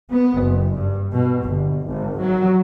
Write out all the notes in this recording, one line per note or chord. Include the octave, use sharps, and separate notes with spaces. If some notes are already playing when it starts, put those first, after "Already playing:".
B3
F#1
G2
B2
G1
G#1
F#3